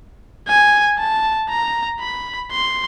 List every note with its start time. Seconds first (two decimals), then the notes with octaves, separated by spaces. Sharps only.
0.48 G#5
0.99 A5
1.49 A#5
2.00 B5
2.51 C6